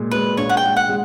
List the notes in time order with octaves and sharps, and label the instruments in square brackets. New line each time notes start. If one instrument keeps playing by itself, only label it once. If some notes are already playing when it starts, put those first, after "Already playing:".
Already playing: [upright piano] A#2 G#3
[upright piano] G#3 [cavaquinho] B4
[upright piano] A#1 [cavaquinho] C#5
[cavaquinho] F#5
G5
[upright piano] G#3
[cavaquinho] F#5
[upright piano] G#3